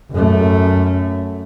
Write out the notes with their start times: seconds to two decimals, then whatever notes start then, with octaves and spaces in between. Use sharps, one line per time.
0.12 F#2 A3